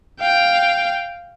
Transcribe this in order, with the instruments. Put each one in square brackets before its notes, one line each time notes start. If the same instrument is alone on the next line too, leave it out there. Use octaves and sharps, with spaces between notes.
[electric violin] F5 G5